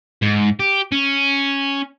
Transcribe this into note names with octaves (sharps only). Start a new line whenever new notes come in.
G#2
G4
C#4